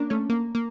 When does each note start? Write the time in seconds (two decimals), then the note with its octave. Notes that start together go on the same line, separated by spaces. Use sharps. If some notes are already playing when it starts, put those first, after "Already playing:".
Already playing: A#3 C#4 D4
0.10 A3 C#4
0.29 A#3
0.55 A#3